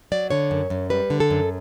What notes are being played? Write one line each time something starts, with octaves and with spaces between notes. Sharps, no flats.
F#3 D5
D3 C#5
F#2
F#2
G3 B4
D3
A4
F#2